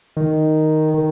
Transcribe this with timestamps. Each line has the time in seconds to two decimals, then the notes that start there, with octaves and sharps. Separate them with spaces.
0.17 D#3
0.94 D#3